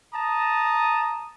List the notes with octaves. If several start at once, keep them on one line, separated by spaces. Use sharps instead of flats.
A5 A#5 D#6